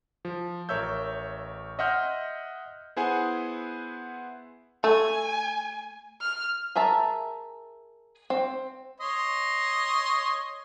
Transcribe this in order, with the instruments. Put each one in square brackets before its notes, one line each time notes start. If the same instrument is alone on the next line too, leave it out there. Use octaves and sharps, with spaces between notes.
[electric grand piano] F3
A1 A#4 C#5 E5 E6 G6
D#5 E5 F#5 C6 F6 G6
B3 E4 G#4 C5 F#5 G#5
[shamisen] A3 [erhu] G#5
[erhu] F6
[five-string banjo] G#4 A#4 E5 A5
C4
[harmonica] C#5 D#5 C6